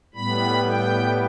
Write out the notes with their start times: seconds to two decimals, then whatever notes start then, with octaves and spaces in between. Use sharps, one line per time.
0.14 A2 G3 B3 B5
0.65 G5